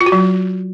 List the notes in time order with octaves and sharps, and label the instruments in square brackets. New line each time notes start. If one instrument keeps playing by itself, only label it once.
[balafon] F4
F#4
F#3